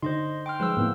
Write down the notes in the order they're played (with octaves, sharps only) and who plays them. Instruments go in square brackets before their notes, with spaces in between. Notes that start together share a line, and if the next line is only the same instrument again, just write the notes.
[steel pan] D3 [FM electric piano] D#4 [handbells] C5 D#5 C6
[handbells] G5 C6 F6
[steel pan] F3 G#3 [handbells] B4 C5 E6
[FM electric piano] A2 [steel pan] A#3 B3 E4